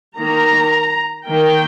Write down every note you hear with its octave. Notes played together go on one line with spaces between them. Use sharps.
D#3 A#3 A#5
D#3 A#3 G5